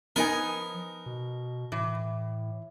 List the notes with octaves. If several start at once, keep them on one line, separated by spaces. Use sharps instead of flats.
F3 B3 D#4 A#4 G#5
B2
A2 E3